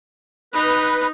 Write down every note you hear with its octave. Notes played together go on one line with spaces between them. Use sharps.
D#4 B4